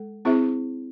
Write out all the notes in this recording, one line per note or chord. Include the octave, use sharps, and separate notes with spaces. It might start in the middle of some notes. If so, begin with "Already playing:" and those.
Already playing: G#3 A4
C4 E4 G#4 C5 E5